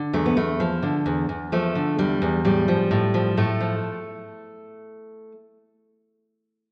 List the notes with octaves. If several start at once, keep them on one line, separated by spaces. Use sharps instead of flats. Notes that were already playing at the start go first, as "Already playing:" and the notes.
Already playing: D3
E2 A3
B3
E2 A3
F3
D3
E2
E2
F3 A3
D3
E2 G3
E2
A2 G3
F3
A2
F3
A2 A3
F3